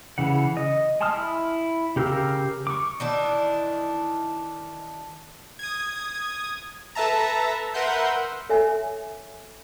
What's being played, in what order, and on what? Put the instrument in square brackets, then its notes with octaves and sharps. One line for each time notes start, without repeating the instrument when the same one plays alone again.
[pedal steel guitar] C#3 E3 F#5
D#5
G#5 A5 C6 D#6 F6
E4
C#3 G4 A#4 F5 E6
C#6 D6
[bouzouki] D#3 E3 D4
[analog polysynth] D#6 G#6
A4 B4 E5 A5 A#5
A#4 B4 E5 F#5 C6 G6
[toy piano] A4 C#5 E5 G#5 A#5